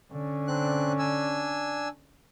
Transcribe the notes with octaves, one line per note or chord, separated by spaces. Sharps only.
D3 C#4
C4 D4 F#6
D4 G#5 E6